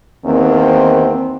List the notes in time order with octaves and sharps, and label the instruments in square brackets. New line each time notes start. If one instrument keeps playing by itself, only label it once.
[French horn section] E2 D#3 A#3 C4